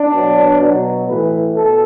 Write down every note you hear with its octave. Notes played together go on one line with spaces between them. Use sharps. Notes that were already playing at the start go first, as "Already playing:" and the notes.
Already playing: D4
B2 F#3
B2 F#3
A2 E3 B4
B2 A4